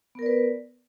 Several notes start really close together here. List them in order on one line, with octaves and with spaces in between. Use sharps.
B3 A#4 D5 B4